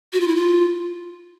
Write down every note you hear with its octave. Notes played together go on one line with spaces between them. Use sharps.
F#4
F4
E4
F4